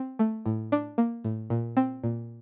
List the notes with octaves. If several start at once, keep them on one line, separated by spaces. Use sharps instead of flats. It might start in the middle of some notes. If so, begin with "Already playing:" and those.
Already playing: C4
A3
A2
D4
A#3
A2
A#2
C4
A#2